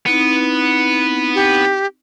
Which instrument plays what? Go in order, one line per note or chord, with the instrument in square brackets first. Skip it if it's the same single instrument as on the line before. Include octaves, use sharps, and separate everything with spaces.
[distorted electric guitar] B3 [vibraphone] C4 D#4 E4
[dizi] G4